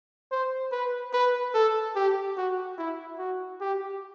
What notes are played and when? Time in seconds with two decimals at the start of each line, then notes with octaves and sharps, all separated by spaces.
0.32 C5
0.72 B4
1.14 B4
1.54 A4
1.96 G4
2.37 F#4
2.78 E4
3.19 F#4
3.60 G4